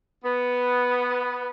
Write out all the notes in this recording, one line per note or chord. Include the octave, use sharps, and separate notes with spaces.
B3